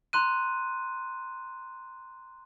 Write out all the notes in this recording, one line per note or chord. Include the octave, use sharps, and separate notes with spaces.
A#5 C6 F#6 D#7